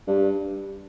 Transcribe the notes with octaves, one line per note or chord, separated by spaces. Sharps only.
G2